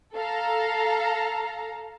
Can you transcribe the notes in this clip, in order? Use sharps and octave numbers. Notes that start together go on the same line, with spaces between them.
A4 F5 A#5